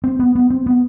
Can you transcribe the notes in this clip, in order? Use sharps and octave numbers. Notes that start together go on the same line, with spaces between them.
C4
B3
B3
C4
B3